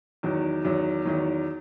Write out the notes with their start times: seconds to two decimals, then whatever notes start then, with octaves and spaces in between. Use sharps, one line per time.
0.23 E2 D#3 F#3
0.64 E2 D#3 F#3
1.06 E2 D#3 F#3